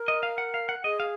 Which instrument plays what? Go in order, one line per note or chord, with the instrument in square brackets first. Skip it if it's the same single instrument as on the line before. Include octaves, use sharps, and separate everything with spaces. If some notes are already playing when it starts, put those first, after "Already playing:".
Already playing: [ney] A#4
[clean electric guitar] D#5
F5
F#5
F5
F#5
[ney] G#4 [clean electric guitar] D#5
[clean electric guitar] F5